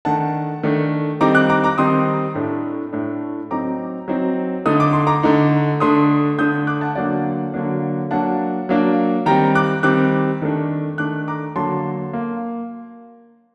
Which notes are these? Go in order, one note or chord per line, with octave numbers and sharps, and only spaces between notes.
D#3 A3 D4 F#5 A5
D#3 A3 D4
D#3 G3 C4 D#4 A#5 D6
D6 F#6
A#5 D6
A#5 D6
D#3 G3 C4 D#4 C6 D#6
A2 A3 D4
A2 A3 D4
F#3 C4 D#4 A#5 D6
F#3 C4 D#4
D3 A3 D#4 D#6
D6
C6
A#5 D6
D3 A3 D#4
D3 A3 D4 C6 D#6
D3 A3 D4 D#6 G6
D6 F#6
F#5 A5
D3 F#3 A#3 D4 D5 F#5
D3 F#3 A#3 D4
F#3 A#3 D4 F#5 A5
F#3 A#3 D4
D#3 G3 C4 G5 A#5
D6 F#6
D#3 G3 C4 D6 F#6
D#3 A3 D4
D#3 A3 D4 D6 F#6
A#5 D6
D3 F#3 A#3 A5 C6
A#3